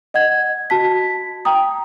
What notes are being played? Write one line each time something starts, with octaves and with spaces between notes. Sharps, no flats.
D#5 F#5 G#6
F#4 A5 B6
G5 A#5 D#6